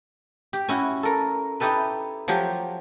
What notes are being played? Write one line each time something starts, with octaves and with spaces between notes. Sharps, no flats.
G4
C#4 E4 F#4
A4 A#4
D#4 E4 G4 A4 B4
F3 F#3 F4 G4